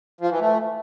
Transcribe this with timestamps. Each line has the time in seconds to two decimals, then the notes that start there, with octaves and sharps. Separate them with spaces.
0.21 F3
0.30 E3
0.40 A3